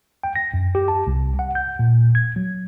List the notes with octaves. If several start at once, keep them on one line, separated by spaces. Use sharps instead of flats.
G5
A#6
F#2
G4
A5
C2
F#5
G6
A#2
G#6
F#3